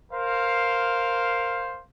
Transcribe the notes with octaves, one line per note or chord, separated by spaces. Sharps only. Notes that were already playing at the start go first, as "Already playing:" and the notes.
A#4 C5 F5